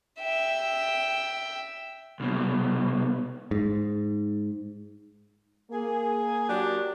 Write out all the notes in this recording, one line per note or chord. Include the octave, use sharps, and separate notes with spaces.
E5 G5
C2 B2
G#2
A#3 G#4
F#3 D4 G4